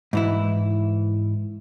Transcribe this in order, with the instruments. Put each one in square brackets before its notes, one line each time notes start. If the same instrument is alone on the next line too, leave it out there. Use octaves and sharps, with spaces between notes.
[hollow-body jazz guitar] G#2 E3 E4